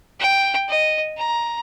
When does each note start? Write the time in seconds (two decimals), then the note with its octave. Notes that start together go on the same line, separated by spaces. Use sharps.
0.19 G5
0.69 D#5
1.17 A#5